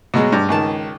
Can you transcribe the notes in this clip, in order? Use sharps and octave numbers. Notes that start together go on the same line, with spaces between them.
B2 F#3 G#3
G2
C#2 D#3 A5